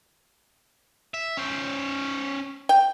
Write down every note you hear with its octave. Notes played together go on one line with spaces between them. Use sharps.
E5
C#4 C5
G5